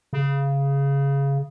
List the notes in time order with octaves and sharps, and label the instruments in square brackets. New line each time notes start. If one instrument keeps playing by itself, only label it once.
[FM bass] C#3